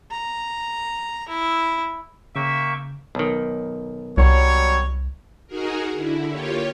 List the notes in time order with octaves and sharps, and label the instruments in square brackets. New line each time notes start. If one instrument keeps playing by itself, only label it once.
[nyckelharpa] A#5
E4
[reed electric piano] C#3 [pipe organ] A#3 G5 C#6 [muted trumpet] E5
[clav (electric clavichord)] B1 D#3
[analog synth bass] C2 [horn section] F#3 G3 C#5
[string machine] D#4 F#4 G#4 A#4
D3 E4
A#3 F4 G4 C#5